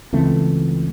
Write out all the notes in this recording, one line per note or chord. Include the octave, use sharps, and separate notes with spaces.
C#2 E3 A3 C4